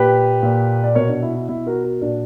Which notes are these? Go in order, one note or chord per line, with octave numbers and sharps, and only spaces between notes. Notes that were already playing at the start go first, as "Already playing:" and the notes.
Already playing: A#2 G4 B4
A#2
D5
B2 A#4 C#5
D4
E4
E4
B2 E4
F#4 A#4
F#4 A#4
A#2 D4 F#4